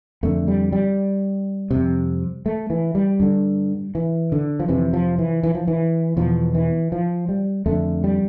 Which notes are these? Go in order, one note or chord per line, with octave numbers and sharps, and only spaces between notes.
F2 D3 A3
G3
G3
F2 C3
A3
E3
G3
G2 D3
E3
D3
F3
F2 C3 E3
F3
E3
E3
F3
E3
E2 B2 F3
E3
F3
G3
F2 D3 A3
G3